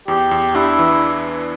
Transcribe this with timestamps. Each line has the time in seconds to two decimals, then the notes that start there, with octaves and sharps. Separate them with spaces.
0.08 E2 G4
0.31 E2
0.55 D4 E4
0.79 E3